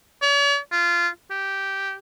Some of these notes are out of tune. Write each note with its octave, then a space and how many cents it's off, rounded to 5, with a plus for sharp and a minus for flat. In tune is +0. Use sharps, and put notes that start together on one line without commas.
C#5 +45
F4 -15
G4 -5